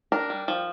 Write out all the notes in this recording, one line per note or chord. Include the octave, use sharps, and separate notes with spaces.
D4 A#4
G3
F3